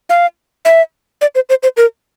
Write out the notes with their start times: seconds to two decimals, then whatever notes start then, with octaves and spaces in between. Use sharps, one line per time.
0.09 F5
0.65 E5
1.21 D5
1.35 C5
1.49 C5
1.63 C5
1.77 A#4